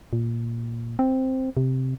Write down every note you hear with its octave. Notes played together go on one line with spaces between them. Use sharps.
A#2
C4
C3